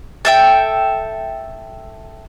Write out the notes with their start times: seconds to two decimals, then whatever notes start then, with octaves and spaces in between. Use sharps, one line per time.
0.25 A4 E5 G5